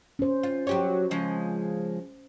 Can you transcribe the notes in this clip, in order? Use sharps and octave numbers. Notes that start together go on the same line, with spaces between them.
C#4 C5
F4
F#3 G4 C#5
C#3 F3 G#3